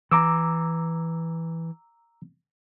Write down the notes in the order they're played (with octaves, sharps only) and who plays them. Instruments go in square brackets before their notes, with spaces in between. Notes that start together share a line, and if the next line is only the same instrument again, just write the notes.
[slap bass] E3 [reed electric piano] A#5 D6 E6